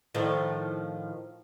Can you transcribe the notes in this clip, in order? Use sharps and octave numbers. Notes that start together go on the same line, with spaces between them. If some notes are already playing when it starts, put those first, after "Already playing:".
A2 D#3 F3